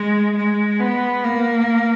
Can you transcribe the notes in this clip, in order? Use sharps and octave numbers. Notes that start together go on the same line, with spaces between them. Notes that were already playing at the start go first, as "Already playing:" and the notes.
Already playing: G#3
G#3
B3
A#3